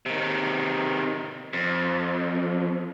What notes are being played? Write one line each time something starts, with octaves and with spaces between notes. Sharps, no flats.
C3 D#3
F2